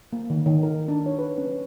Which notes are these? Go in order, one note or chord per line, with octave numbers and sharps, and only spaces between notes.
A#3
D#3
D#3
A#4
D4
C#5
B4
C#4